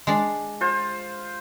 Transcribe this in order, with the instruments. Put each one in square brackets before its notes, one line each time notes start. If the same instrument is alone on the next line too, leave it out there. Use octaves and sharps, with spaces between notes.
[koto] G#3 D4
[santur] F4 C5